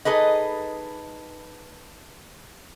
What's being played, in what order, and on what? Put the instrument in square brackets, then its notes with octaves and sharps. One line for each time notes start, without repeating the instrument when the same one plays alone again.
[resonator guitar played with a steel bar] D#4 G#4 A4 B4 D#5